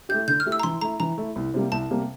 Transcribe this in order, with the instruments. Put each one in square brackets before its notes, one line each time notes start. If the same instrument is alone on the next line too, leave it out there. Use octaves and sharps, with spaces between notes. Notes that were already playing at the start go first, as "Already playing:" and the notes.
[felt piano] A3 E4 G4 [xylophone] G6
[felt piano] D3 [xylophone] G6
[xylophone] F6
[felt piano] A3 E4 G4
[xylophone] E6
A#5
[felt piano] E3 [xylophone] C6
[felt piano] A3 E4 [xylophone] A#5
[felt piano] E3 [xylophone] A#5
[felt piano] A3 E4
C2
C3 G3 A#3
[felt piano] C2 [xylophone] A5
[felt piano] C3 G3 A#3